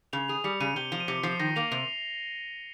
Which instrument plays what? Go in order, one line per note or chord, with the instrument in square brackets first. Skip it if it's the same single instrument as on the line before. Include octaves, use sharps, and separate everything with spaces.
[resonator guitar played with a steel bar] C#3 [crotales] F7
[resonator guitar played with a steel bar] G#4 [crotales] F7
[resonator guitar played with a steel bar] G3 [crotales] C#7
[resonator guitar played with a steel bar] C#3 [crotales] D#7
[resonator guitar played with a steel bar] C3 [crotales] G7
[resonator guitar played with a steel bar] F3 [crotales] F7
[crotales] D#7
[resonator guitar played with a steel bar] C3 [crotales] C#7
[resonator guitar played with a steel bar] F3 [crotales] C7
[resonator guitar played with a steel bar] D#3 [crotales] A#6
[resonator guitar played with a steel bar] A#3 [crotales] F7
[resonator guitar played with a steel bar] C3 [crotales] F7